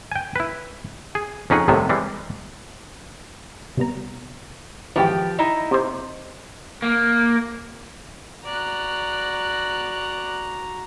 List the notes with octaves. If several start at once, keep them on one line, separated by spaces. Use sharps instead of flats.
G5 G#5
E4 B4
G#4
F2 C#4 D#4 G#4 F#5
C2 A2 C3 D#3 B3
E3 G3 G#3
C3 G3 B3 A#5
G#1 E3 F3 G4 G5
D#4 E4 D#5
C3 C5
A#3
F#4 D5 A#5 F#6